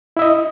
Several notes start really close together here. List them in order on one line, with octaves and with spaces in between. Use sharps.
E4 E5 D#5